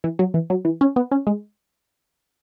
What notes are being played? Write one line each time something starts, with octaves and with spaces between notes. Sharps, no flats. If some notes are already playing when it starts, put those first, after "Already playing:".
E3
F#3
E3
F#3
E3
C#4
B3
C#4
G#3